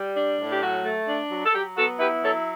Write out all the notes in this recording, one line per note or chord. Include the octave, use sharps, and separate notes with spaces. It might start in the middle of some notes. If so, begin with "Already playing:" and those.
Already playing: G3
D4
A2
G4
F#3 F#4
A3
D4
F#3
A4
F#3 G4
B3 F#4 A4
E4 G4 B4
F#3 A4 C#5